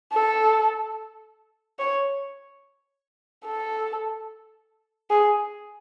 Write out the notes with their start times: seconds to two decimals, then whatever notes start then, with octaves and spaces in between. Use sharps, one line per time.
0.13 A4
1.79 C#5
3.45 A4
5.10 G#4